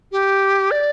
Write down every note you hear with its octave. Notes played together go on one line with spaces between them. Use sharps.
G4
D5